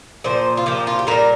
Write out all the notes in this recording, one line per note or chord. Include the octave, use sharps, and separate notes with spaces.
A#2 F3 C5
F4
A#2 F3 G4
F4
G4
A#2 G3 A#4